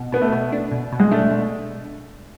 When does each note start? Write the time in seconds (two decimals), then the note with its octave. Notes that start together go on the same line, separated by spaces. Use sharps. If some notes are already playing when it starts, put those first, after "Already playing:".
Already playing: B2
0.12 B2 B3
0.22 A3
0.32 B2
0.52 D4
0.71 B2
0.92 B2
1.00 G#3
1.11 A3 D4
1.31 B2